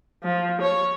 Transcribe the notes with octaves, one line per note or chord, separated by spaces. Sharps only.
F3
C#5